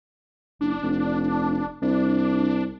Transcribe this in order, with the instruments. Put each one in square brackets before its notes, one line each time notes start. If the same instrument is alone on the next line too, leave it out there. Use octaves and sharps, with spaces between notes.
[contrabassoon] F#1 [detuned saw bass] D4
[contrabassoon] F1
[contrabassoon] C2 [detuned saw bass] D4